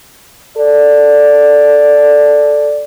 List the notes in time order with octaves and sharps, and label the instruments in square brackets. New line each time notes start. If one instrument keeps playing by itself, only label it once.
[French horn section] A4 D5